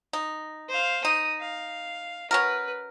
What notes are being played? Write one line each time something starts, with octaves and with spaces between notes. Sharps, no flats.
D#4
C5 F5
D#4 D#6
F5
C#4 F#4 A#4 B4